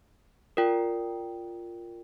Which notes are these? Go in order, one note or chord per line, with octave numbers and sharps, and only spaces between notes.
F4 A#4 D5 G5